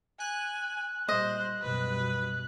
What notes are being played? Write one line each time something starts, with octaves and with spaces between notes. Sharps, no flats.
G#5 F#6
A#2 G3 C5 D#5
F#2 B2 G3 B4